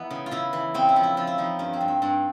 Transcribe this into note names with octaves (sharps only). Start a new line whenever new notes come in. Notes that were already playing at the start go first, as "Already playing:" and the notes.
Already playing: E3 B3 D#4
C#3
F4
C#3 E4
E3
C#3 C4
E4
F3
E4
F3 F4
E4
F3 D#4
G2 C#4
C4
G2
C4
G2 C4